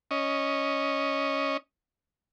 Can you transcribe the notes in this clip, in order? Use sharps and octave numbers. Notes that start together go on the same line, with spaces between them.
C#4 D#5